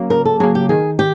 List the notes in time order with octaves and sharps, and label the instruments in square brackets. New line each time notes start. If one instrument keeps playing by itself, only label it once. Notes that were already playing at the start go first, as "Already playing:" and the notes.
Already playing: [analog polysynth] C#3 F#3 A#3
[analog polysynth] C#3 [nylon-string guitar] A#4
[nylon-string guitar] A4
[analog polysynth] F#3 A#3 [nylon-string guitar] G#4
[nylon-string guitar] G4
[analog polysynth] D#3 [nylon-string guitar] G#4
[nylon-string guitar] G4